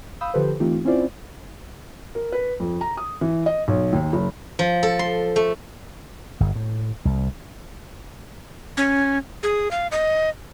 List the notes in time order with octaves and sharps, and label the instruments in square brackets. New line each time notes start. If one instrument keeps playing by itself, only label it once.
[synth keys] F5 B5 D#6 E6 G6
D3 F3 G4 A4 B4 C5
E3 A3 C4 D#4 F4 G4
C4 C#4 E4 F4 C5 D5
[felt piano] A#4
B4
F2
A#5
D#6
E3
D#5
B1
D#2
F#1
[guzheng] F3
A4
C6
A3
[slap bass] G1
A2
C2
[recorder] C#4
G#4
F5
D#5